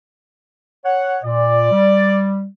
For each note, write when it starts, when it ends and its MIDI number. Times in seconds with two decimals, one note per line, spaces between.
0.85 1.17 73
0.85 1.17 78
1.24 1.69 46
1.24 2.39 74
1.72 2.46 55